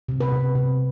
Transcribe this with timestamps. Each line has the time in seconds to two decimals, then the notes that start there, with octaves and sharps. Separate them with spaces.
0.09 C3
0.21 B4
0.32 C3
0.55 C3